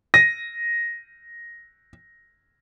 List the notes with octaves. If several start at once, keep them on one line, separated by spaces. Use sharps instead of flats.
A#6 D#7